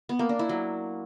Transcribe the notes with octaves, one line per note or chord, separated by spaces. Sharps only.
B3
A#3
D4
E4
F#3